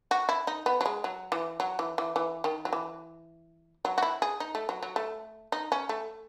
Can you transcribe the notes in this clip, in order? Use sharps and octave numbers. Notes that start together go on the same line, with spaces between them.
F#4
E4
D#4
B3
F#3
G#3
F#3
E3
F#3
E3
E3
E3
D#3
F#3
E3
F#3
F#4
E4
G#4
D#4
A3
F#3
F#3
A3
D#4
C#4
A3